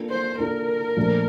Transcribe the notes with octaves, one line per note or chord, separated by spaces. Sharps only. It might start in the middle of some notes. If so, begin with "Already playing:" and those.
Already playing: A#3 D4 F4 A4
C5
A#3 D4 F4 A4 A#4
A#2 F3 A3 D4